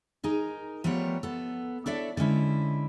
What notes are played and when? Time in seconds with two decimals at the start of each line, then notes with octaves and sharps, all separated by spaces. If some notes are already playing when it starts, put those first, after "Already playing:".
0.24 D#4 G#4 A#4
0.84 F3 G3 A3 B3 A#4 C#5
1.23 B3 A4
1.86 D4 E4 A4 C#5 D5 E5
2.17 D3 G#3 C#4 E4